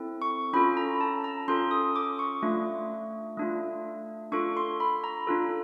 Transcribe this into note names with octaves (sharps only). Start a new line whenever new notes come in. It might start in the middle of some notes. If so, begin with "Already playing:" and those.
Already playing: C4 E4 A4
C#6
C#4 F4 A4 B5
A#5
A5
A#5
C#4 F4 A4 C6
D#6
D6
C#6
A3 D4 F4
A3 D4 F4
D4 F4 A4 C#6
C6
B5
A#5
D4 F4 A4